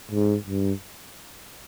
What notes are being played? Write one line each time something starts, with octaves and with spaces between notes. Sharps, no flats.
G#2
G2